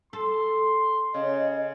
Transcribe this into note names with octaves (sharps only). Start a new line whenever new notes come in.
A4 C6
C#3 D#5